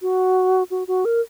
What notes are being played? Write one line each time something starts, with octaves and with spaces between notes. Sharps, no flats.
F#4
F#4
F#4
A#4